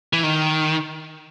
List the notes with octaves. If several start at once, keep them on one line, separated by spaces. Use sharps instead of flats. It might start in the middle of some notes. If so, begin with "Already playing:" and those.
E3
D#3